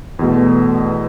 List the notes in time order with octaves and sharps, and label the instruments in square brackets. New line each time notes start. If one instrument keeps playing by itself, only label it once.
[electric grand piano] E2 B2 A3